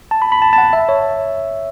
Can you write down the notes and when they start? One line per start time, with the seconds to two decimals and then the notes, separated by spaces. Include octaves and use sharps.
0.11 A5
0.22 B5
0.32 B5
0.42 A5
0.53 A5
0.58 F#5
0.73 E5
0.89 C#5